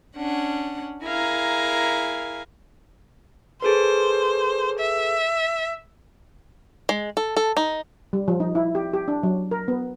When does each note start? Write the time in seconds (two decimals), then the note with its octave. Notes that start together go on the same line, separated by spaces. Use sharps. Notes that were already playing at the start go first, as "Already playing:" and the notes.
0.15 C#4 D4 F#5
1.04 E4 G#4 A#4 F5 G#5 A#5
3.62 G#4 A4 B4 C5
4.79 E5
6.89 G#3
7.17 A4
7.37 A4
7.57 D#4
8.13 G3
8.28 F3
8.40 D#4
8.55 E4
8.75 G4
8.94 G4
9.08 D4
9.23 F#3
9.51 A#4
9.68 B3